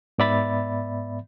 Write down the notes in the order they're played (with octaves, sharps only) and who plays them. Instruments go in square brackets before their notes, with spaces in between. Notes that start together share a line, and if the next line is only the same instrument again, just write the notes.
[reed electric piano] G#2 B3 D5 E5 B5 A6